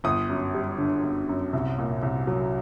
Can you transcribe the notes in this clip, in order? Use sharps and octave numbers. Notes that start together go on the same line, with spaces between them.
G1 D#6
F#2
G3
D3
G1
F#2
C2
A#2
C2
F#3